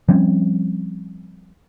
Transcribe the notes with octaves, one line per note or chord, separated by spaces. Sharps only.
F3 G3 C4 C#4